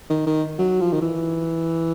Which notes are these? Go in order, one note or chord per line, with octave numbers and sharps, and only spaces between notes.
D#3
D#3
F#3
F3
D#3
E3